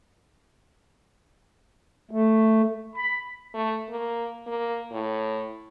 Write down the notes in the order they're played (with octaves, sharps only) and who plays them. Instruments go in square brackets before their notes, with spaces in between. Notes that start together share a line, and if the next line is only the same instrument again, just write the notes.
[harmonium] A3
[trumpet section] B5
[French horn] A3
A#3
A#3
A2